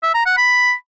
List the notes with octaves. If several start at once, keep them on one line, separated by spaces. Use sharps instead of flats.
E5
A#5
F#5
B5